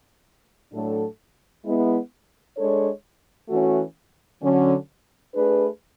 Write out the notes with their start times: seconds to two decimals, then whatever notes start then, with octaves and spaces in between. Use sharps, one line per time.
0.72 A2 F#3 A3 D4 A4
1.65 G#3 B3 E4
2.57 G#3 D4 A4 C#5
3.49 E3 A3 C#4 F#4
4.42 D3 F#3 C#4
5.34 A3 D4 G#4 B4